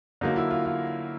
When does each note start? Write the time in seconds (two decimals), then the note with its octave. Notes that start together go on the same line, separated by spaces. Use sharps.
0.21 D3 F#3 A#3 D#4
0.36 E4
0.51 F4
0.65 F4